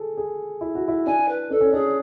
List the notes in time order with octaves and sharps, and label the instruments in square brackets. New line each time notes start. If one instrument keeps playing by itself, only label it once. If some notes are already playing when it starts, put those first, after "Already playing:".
Already playing: [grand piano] G#4 A4
G#4
E4
F#4
E4
[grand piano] D4 [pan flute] G#5
[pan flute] B4
[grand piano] D4 [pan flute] A4
[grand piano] C#4
[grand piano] D4 [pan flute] G#4